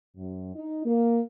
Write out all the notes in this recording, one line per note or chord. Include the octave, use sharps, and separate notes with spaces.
F#2
D#4
A#3